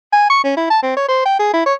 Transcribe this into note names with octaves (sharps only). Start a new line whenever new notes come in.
G#5
C#6
C#4
E4
A5
C4
C#5
C5
G5
G#4
E4
C#5